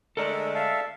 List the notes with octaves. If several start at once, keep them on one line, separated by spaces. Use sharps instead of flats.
D3 G#3 A3 A4 A#4 D5
E5 F5 A5